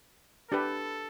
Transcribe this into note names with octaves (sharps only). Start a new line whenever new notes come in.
D4 G4 A4 B4